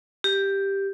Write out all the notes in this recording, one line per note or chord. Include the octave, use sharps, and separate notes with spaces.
G4